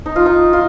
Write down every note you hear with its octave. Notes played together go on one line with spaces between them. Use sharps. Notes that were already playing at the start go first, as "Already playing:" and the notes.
D#4
F4
D#4
F4